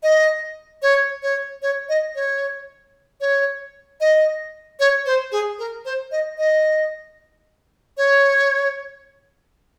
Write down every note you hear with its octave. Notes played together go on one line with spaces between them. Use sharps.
D#5
C#5
C#5
C#5
D#5
C#5
C#5
D#5
C#5
C5
G#4
A#4
C5
D#5
D#5
C#5